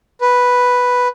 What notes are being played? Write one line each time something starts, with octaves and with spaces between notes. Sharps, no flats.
B4